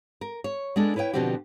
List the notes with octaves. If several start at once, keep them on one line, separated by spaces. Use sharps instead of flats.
A#4
C#5
G#3 B3 D4 A4
E4 B4 C#5 D#5 G5
B2 D3 F3 C4 F#4 G4